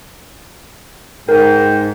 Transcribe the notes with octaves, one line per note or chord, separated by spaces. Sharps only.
G#2 A#4 G5